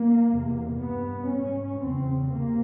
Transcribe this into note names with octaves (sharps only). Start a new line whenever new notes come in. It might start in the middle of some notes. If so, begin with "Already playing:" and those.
Already playing: A#3
E2 C3
G2 B3
G#2 C#4
E2 C#3 C4
C3 A#3